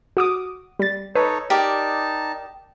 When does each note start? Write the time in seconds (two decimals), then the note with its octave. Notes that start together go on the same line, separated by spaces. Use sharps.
0.17 F#4 D6 D#6
0.79 G3 A6
1.15 D#4 A4 B4 C#5
1.50 D#4 G4 A#4 D5 A5